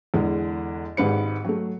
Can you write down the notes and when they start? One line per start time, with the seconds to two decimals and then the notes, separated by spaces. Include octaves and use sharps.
0.14 E2 D3 G#3
0.97 G#1 G#2 G4 B4 C#7
1.45 F#3 A3